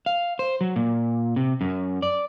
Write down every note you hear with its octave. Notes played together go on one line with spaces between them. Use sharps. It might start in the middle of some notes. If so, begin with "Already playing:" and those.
F5
C5
F#3
A#2
C3
F#2
D5